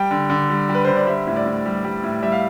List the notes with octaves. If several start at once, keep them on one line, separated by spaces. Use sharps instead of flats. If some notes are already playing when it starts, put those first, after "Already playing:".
Already playing: G3 G5
D3
D3
G3
G3
B4
D3 C5
D5
G3 E5
A2
D5
A2
G3
G3
A2
G3 E5
F5